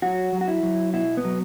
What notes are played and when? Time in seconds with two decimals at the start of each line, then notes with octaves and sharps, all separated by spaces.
0.02 F#3 F#4
0.32 F#3
0.41 F#4
0.48 E4
0.63 F#3
0.93 B2 E4
1.17 B3
1.25 F#3